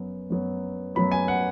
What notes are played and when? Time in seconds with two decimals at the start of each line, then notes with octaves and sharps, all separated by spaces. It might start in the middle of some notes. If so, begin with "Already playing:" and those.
Already playing: F#2 F#3 B3
0.30 F#2 F#3 B3
0.95 F#2 F#3 B3 B5
1.11 G#5
1.28 F#5